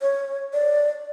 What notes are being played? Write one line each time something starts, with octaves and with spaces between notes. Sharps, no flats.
C#5
D5